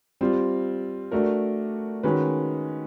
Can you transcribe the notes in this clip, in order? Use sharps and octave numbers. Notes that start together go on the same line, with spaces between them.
G3 C4 F4
A3 D4 F#4 A#4
D#3 G#3 C#4 F#4 B4